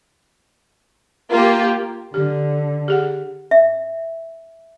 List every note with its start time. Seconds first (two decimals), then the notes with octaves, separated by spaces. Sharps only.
1.31 A#3 F4 G4
2.14 D3 G4
2.88 G4 G#4 F#5
3.51 E5